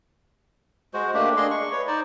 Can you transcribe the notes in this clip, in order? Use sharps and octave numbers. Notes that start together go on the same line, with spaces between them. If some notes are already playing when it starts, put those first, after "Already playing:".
G#3 F#4 C5
A3 A#3 D4 G4
D4 G#4 D#5 C6
C#6
B4 C#5
D#4 C5 D5